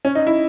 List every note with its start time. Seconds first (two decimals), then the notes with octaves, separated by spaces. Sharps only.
0.05 C#4
0.15 D#4
0.27 E4